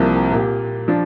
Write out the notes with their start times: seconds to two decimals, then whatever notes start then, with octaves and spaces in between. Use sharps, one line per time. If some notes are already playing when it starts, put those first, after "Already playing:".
Already playing: C2 C3 F3 A#3
0.31 A#2 A#3 G4
0.88 F3 D4